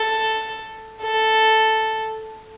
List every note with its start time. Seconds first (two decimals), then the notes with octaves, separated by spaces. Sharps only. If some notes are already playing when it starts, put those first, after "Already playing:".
Already playing: A4
1.02 A4